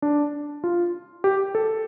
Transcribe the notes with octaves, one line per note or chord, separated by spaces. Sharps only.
D4
F4
G4
A4